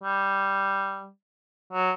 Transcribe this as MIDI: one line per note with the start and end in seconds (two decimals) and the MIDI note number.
0.03 1.09 55
1.73 1.92 54